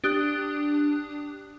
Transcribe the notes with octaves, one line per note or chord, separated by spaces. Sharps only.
D4 G4 D#6 F#6